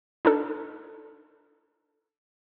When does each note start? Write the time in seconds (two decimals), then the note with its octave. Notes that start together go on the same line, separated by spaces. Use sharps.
0.25 D4 D#4 A4